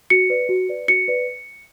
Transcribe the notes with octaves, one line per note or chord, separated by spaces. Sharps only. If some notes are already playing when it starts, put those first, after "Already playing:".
F#4 C#7
B4 D5
F#4
B4 D5
F#4 C#7
B4 D5